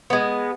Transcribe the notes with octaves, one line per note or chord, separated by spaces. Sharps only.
G#3 B3